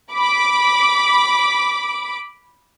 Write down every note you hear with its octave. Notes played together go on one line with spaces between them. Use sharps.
B5 D6